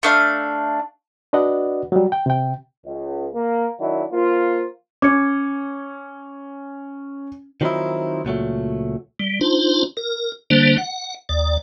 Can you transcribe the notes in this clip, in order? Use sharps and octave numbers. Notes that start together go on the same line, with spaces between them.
A3 D4 F5
D4 F#4 B4 D5 D#5 F#5
F#3 G3
G5
C3 G5
C#2
A#3
D#3 F#3 D4 E4
F3 A#3 F4
C#4 D6 G#6 C#7
D#3 F3 F#3 C4 D#4 E4
C#2 A#2 F#3 A3
G3
D4 D#4 F4 C5
A#4
D3 G3 A#3 D4 C5
F#5
D#2 D5